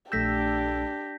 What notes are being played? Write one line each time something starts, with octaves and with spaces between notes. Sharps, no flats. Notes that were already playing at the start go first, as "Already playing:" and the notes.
A#1 A3 D4 G4 E6 G6 A#6 B6